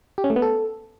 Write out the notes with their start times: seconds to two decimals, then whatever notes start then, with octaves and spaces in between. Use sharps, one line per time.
0.18 G4
0.24 C#4
0.30 A3
0.36 B3
0.42 A4